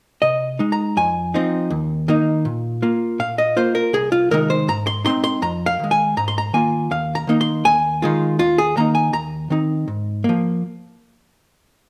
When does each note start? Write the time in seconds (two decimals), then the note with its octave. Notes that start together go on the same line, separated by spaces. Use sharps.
0.22 C3 D#5
0.59 G#3 D#4
0.72 A#5
0.97 F2 G#5
1.34 F3 C4 D#4
1.70 D#2
2.08 D#3 A#3 D#4
2.45 A#2
2.82 A#3 F4
3.19 A#2 F5
3.38 D#5
3.57 A#3 F4 C5
3.75 A#4
3.93 C2 G#4
4.12 F4
4.31 C3 D#3 G#3 D#4 A#4
4.50 C5
4.68 G#2 A#5
4.87 C6
5.05 G#3 C4 D#4 C6
5.24 C6
5.42 F2 A#5
5.66 F5
5.79 D#3 G#3
5.91 G#5
6.17 G#2 A#5
6.28 C6
6.38 A#5
6.53 D#3 A#3 F4 G#5
6.91 D#2 F5
7.15 A#5
7.27 D#3 A#3 D#4
7.41 C6
7.65 D#2 G#5
8.02 D#3 G#3 F4
8.39 D#2 F4
8.58 G#4
8.77 D#3 A#3 D#4 A#5
8.95 G#5
9.13 D#2 A#5
9.50 D#3 C4 D#4
9.88 G#2
10.24 F3 A#3